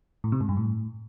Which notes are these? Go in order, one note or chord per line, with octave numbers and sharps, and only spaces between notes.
A2
C3
G#2
G2
A2